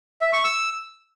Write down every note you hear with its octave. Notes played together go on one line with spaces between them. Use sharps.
E5
C#6
E6